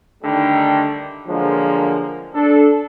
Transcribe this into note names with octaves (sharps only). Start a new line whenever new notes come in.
D3 D#3 G3 A3 D#4
D3 F3 F#3 G#3 A#3
D4 A4